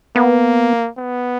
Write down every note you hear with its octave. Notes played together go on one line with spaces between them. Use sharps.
A#3 B3
B3